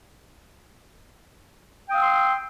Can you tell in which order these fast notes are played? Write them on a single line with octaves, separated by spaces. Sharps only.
G5 D#6 F5 E6 C6